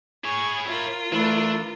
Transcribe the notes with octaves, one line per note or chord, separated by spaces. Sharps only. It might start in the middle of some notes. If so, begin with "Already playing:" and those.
E4 G#4 C#5 C#6
F4 A#4
E3 A3 D4 B4